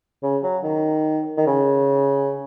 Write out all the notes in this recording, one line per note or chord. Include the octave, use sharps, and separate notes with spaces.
C#3
F#3
D#3
D#3
C#3